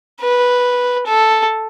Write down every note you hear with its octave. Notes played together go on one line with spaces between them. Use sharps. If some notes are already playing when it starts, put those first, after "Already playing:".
B4
A4